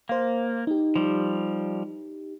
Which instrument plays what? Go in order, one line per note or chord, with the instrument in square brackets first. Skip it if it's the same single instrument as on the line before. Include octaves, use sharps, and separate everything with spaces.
[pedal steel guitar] A#3 [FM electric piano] C5 F5
[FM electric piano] D#4 G4
[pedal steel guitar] F3 G3